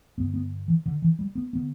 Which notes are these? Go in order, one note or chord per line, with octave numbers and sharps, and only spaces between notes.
G2 D3 B3
B3
E3
D3
E3
G3
B3
D3 B3